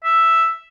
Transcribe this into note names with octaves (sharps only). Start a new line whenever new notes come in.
E5